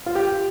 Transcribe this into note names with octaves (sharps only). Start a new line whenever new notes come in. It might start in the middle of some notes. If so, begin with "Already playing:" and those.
F4
G4